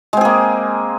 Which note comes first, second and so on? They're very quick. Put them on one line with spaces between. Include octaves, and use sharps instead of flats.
G#3 C4 G#4 A#3